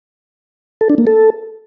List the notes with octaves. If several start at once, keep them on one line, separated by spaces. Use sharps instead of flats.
A4
D4
A#3
A4